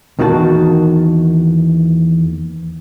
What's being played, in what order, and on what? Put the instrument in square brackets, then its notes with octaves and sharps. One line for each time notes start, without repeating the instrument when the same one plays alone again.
[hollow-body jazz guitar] E2 D#3 A#3 F#4 A5